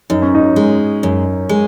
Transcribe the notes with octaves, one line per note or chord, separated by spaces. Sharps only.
F#2 D#4
C#4
D#4
G#3
F#2
G#3